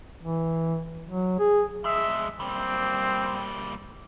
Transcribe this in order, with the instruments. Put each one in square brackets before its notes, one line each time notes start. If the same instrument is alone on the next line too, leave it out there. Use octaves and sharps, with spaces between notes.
[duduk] E3
F#3
G#4
[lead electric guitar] F2 G#3 [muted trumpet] E5
[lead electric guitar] G3 A#3 [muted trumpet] C4